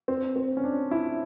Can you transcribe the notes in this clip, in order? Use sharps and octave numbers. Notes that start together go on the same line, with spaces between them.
C4
C4
C#4
D4
E4